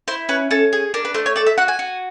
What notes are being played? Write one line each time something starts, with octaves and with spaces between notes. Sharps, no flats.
E4 C5
C#4 B4
C#4 A4
G#4
D4 A#4
B4
A3 C5
C#5
A4 D5
E5
F#4 F#5
G#5
F#4